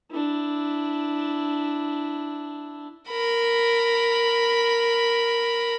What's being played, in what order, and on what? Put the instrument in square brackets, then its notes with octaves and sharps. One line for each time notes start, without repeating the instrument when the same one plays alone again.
[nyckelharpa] D4 E4
[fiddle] A#4 B5